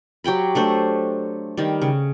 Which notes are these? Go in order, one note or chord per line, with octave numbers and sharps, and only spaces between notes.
F#3 G4 G5 B5
A3 D4 C5
D#3 G3
C#3